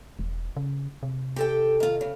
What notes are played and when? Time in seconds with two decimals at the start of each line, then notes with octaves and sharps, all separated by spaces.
0.19 E1
0.56 C#3
1.03 C3
1.36 G4 A4 G5
1.80 D#3 F4
2.01 C#3